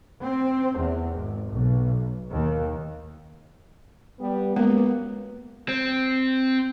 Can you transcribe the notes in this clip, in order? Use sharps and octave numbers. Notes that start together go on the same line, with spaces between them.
C4
E2
G#1
B1
D#2
G3 B3
F#2 G#3 A#3 B3
C4